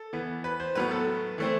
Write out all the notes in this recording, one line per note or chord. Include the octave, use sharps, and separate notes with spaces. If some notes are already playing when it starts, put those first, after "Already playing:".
Already playing: A4
E3 B3
B4
C5
A2 F#3 B3 B4
A4
E3 A3 C4